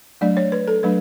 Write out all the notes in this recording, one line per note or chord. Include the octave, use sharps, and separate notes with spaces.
F#3 A3 D4 D5
C#5
B4
A4
F#3 A3 D4 B4